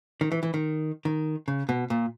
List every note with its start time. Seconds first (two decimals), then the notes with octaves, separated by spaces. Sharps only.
0.21 D#3
0.32 E3
0.43 E3
0.54 D#3
1.05 D#3
1.48 C#3
1.69 B2
1.90 A#2